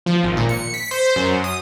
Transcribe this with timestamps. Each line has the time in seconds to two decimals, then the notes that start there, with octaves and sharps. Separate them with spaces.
0.06 F3
0.23 G#1
0.37 A#2
0.49 C#7
0.74 B6
0.91 C5
1.16 F#2
1.44 D#6